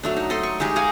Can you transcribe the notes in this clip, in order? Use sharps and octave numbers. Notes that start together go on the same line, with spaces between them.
F#3 A3 D4
D#4
A4 D#5 C6
C#6
G#3 D#4 G4 G#4
F5 F#5 G#5 A#5